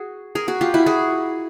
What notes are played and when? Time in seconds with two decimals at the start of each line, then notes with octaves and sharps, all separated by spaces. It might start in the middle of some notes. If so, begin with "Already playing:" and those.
Already playing: F#4 G#4
0.35 G#4 A#4
0.48 F#4 G#4
0.61 F4 G4
0.74 E4 F#4
0.86 F#4 G#4